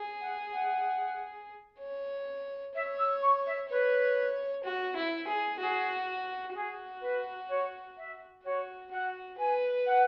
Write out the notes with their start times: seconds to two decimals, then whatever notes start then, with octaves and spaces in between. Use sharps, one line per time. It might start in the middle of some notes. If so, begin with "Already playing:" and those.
Already playing: G#4
0.20 F#5
0.52 F#5
1.79 C#5
2.74 C#5 E5
2.98 E6
3.22 C#6
3.46 E5
3.69 B4 C#5
4.64 F#4
4.96 E4
5.27 G#4
5.59 F#4 G#4
6.54 F#4 G#4
7.01 B4
7.48 C#5
7.97 E5
8.43 F#4 C#5
8.91 F#4 F#5
9.38 B4 G#5
9.86 F#5